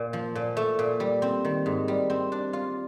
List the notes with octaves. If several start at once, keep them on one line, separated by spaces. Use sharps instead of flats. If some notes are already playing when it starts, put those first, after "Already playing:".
Already playing: A#2
F3
A#2
A3
A#2
G3
C4
D#3
G#2
G3
C4
D4
F4